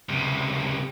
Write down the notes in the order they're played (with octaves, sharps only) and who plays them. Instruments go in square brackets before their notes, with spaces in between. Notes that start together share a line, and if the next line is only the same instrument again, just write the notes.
[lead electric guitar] C#2 C3